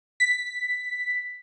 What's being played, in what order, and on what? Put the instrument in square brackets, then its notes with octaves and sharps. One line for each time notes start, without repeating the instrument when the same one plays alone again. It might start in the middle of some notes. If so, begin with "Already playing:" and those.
[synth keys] B6